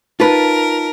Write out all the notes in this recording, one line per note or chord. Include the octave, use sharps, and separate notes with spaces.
D#4 F4 A#4 B4 A5 B6